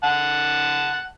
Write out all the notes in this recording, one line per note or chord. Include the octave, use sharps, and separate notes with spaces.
F#5 A5